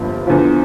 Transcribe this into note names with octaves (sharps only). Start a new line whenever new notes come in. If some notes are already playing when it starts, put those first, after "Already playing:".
Already playing: G1 G2 F3 A#3 F4
E2 D3 F3